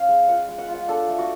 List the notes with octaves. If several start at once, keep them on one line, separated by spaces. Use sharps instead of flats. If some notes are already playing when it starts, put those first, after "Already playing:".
Already playing: C#4 F5
G#3
F4 F#5
G#3
F#5
F4
F#5
D4 A4
A3
F#4